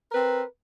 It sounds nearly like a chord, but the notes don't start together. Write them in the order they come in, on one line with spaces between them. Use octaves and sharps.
A#4 B4 C4